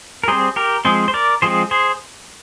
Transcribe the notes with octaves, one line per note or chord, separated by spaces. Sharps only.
A#4
G3 C4 G#4 C5
G4 A#4
F3 G#3 C4 G#4 C5
C5
A#4 D5
F3 G#3 C4 G#4 C5
G#4 C5